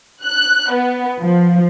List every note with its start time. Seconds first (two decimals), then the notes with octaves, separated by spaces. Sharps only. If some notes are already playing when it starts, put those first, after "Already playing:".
0.23 F#6
0.72 B3
1.20 F3